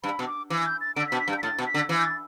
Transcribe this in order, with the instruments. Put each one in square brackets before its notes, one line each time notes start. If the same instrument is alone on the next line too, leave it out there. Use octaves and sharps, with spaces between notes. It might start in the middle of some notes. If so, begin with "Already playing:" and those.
[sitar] G2 [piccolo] B5
[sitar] B2
[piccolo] D6
[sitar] E3 [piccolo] D6
[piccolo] G6
A6
[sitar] D3 [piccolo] D7
[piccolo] B6
[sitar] B2
[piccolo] B6
[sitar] G2
[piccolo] G6
B6
[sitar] A2 [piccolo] A6
[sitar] B2
[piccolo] B6
[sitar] D3
E3
[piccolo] G6
A6